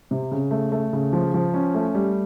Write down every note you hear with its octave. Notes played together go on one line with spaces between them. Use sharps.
C3
C#3
A3
A3
C#3
F3
F3
C#4
A3
G3